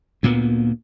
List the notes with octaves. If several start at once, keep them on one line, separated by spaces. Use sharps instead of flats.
D2 A#2 A#3 B3